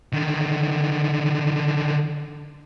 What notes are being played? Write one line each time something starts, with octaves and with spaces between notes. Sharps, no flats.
D3 D#3